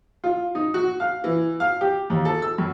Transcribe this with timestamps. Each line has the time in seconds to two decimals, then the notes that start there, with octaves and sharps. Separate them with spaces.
0.24 F4
0.55 D#4
0.74 F#4
1.00 F5
1.24 E3
1.60 F5
1.81 G4
2.10 D#2
2.25 A4
2.42 E6
2.58 F#2